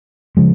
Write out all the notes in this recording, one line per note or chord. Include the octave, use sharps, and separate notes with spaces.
C#3 F3 G#3